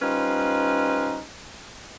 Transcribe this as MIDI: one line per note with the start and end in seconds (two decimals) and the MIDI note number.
0.02 1.20 55
0.02 1.20 61
0.02 1.20 63
0.02 1.20 65
0.02 1.20 71
0.02 1.20 72